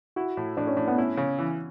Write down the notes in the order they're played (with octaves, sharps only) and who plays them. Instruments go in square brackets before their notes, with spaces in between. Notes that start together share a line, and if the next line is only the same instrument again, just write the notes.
[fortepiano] E4 [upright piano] F#4
[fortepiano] A2
[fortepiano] A2 [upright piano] D4
[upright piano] C#4
[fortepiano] A2
[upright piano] B3
[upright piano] C#4 [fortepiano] E4
[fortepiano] C#3
E3